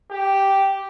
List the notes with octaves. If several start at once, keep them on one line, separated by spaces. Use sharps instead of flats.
G4